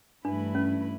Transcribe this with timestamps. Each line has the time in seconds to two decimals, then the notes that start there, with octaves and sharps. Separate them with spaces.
0.25 G2 E3 A3 D4 E4 B4
0.55 C#4